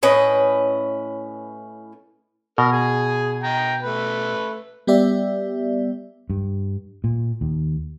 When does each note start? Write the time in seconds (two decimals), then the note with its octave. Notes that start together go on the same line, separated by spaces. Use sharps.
0.03 A2 C#4 B4 D#5
2.58 B2 A#4
2.72 G#4 G#5
3.43 G5 A#5
3.83 A3 B4
4.87 G3 B3 G4 D5 E5
6.30 G2
7.04 A#2
7.41 D#2